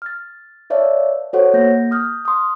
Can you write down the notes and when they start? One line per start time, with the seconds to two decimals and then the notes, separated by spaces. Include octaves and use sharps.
0.02 F6 A6
0.70 B4 C#5 D5 E5 F5 A5
1.33 F#4 A4 C5 C#5 F#5
1.54 A#3 G6 A#6
1.91 D#6 F6 G6
2.25 C6 D#6